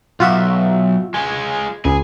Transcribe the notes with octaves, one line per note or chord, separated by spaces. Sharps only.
B1 F4 F#4 E5
G#3 F4 G#5
C#2 G#4